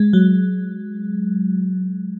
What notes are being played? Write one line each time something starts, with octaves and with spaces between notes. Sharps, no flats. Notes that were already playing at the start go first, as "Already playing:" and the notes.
Already playing: G#3
F#3